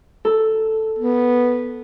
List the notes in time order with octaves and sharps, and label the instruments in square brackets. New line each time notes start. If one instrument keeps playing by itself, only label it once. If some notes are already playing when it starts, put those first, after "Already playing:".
[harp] A4
[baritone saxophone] B3